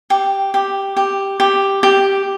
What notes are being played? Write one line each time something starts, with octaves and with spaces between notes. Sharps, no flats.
G4
G4
G4
G4
G4